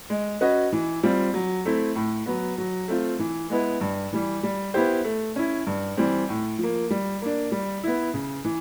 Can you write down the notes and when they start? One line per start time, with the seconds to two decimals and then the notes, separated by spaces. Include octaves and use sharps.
0.10 G#3
0.41 C#4 F#4 B4 D#5
0.73 E3
1.03 G3 C4 F4
1.34 F#3
1.65 A3 C4 E4
1.95 A2
2.26 F#3 B3
2.58 F#3
2.88 A3 C4 F4
3.19 E3
3.50 G#3 B3 E4
3.81 G2
4.13 E3 G3
4.43 G3
4.74 B3 E4 G4 C5
5.04 A3
5.36 C#4 E4
5.67 G2
5.97 E3 G3 C4
6.29 A2
6.59 F3 A#3
6.90 G3
7.22 A#3 D4
7.52 G3
7.84 B3 E4
8.14 C#3
8.45 E3